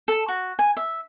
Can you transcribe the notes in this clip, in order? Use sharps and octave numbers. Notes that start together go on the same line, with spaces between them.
A4
F#4
G#5
E5